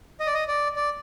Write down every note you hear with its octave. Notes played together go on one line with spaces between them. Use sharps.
D#5
D5
D#5
D5
D5